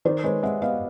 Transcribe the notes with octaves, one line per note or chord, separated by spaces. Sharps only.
D#3 C5 D5
G#3 B4 C#5
G#3 E5 F#5
B3 D#5 F5